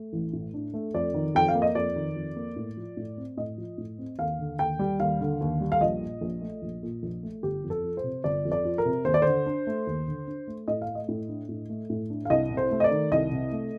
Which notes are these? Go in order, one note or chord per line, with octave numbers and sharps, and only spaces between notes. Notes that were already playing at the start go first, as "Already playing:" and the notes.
Already playing: A3
A1
A2
D4
A3
F2 D5
D#3
F2 G5
F5
A#3
D#5
F2 D5
D#3
F2
A#3
A2
F3
A2
C4
A2 D#5
F3
A2
C4
D#2 F5
D3
D#2 G5
G3
D#2 F5
D3
D#2
G3
F5
A#1 D#5
A#2
A#1
A3
A#1
A#2
A#1
A3
G1 G4
F2
A4
F3
C5
C3
G1 D5
F2
D5
F3
A#4
C3
D#2 C5
D5
D3 C5
D4
A3
D#2
D3
D4
A3
A2 D#5
F5
A3
D#5
A2
D4
A2
A3
A2
D4
F5
C2 D#5
C3
C5
A3
D#5
D5
D#3
C2 D#5
C3
A3